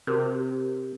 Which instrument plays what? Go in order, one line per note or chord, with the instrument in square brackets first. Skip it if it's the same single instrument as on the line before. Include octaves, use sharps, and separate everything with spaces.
[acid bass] C3 [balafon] F#4 G4 A#4